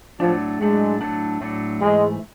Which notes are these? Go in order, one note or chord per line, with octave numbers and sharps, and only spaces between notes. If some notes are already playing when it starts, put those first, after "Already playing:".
A2 F3 F#3 A3 D4
A2 F#3 G#3 A3 D4
A2 F#3 A3 D4
A2 F#3 A3 D4
G#2 E3 G#3 A3